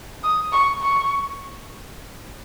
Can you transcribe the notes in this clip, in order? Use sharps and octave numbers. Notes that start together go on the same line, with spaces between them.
D#6
C#6
C#6